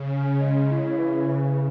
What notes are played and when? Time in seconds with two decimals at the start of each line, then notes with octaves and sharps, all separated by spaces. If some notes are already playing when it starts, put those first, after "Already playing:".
Already playing: C#3
0.11 C#4
0.41 G#3
0.69 E4
0.98 C#3 E3
1.27 E3